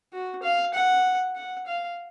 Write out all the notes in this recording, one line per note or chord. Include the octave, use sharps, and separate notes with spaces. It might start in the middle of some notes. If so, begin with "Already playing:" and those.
F#4
F5
F#5
F#5
F5